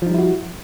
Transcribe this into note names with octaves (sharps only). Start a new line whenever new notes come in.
F3 G3 D#4 E4 F#4